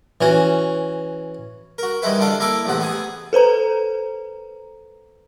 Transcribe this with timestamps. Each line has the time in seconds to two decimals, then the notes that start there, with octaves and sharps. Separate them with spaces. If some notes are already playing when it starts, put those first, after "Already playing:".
0.21 E3 C#4 F#4
1.78 F#4 A#4
2.02 D#3 G3 G#3 E4 B4
2.20 D3 D4 A4 D5 F5
2.40 A#3 E4 A4 A#5 D6
2.66 A1 E2 C3 F#5
2.80 B3 G#4 G#5
3.33 A4 B4 C5 A#5